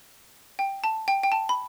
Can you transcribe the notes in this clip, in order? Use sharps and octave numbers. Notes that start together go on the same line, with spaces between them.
G5
A5
G5
G5
A5
B5